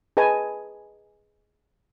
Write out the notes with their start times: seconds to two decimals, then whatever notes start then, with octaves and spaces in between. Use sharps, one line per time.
0.17 G#4 B4 D#5 G#5 A5